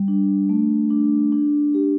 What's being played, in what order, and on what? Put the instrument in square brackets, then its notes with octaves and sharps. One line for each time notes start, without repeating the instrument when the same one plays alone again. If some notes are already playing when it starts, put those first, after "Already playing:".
Already playing: [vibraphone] G3
D4
A3
D4
D4
G4